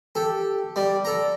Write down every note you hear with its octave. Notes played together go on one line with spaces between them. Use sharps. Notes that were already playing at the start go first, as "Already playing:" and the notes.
G4 A4
G3 D5
A4 A#5